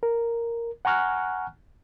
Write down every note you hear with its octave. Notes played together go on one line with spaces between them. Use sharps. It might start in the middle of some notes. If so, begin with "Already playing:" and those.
A#4
F#5 G#5 A#5 C#6 F6 F#6